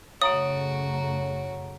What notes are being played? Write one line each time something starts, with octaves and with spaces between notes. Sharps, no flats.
F#2 C#3 A3 F#4 C#5 A#5 D#6 D7